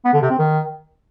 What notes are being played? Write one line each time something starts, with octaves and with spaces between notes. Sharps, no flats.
B3
D3
C3
C4
D#3